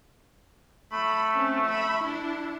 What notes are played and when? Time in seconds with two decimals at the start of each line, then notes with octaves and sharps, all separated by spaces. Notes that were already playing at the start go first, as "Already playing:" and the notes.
0.92 A3 B5
1.35 C4 C#4
1.66 E5 B5
2.04 D4 E4